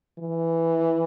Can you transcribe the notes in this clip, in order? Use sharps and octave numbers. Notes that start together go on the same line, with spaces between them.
E3